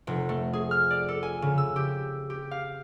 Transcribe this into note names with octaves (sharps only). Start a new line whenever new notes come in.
F1
A3
G#4
F6
D5
A4
G#5
C#3
E6
G4
G4
F5